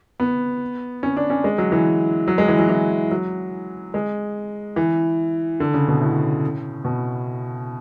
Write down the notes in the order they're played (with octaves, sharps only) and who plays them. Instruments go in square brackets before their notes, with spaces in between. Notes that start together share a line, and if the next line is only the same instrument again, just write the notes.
[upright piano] B3
C#4
D4
C#4
G#3
F#3
E3
F#3
G#3
E3
F#3
E3
F#3
G#3
E3
D3
C#3
B2
A2
B2